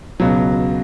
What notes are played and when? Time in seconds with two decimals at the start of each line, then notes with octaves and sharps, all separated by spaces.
0.20 C#2 B2 F#3